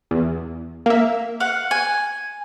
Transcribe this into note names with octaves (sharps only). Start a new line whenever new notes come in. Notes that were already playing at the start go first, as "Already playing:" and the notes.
E2
A#3 E5
F5 F#5
G#5